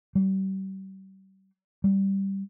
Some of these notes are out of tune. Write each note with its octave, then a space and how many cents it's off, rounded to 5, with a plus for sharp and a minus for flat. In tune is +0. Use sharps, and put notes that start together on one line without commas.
G3 -35
G3 -5